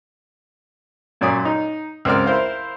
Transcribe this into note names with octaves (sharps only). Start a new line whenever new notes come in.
F#2 A#2 C#5 D5 D#6
D#4
C#2 C4 A#4 D5 F6
E4 A#4 C5 F5